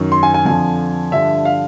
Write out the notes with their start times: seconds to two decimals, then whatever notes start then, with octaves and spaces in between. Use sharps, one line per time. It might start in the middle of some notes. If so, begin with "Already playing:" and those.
Already playing: F#2 D#3
0.12 C6
0.23 G#5
0.34 G#5
0.45 F2 D3 F3 G#5
1.11 G2 D3 F3 E5
1.45 F5